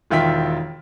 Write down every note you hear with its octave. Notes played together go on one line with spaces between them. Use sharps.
E1 D#3 F4 E5 G5 B6